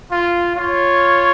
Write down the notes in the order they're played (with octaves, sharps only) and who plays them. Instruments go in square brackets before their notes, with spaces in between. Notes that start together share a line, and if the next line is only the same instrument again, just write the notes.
[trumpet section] F4
[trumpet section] F4 [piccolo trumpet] C#5